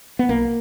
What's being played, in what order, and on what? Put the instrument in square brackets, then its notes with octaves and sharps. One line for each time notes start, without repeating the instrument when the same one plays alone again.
[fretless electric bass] B3
B1 A#3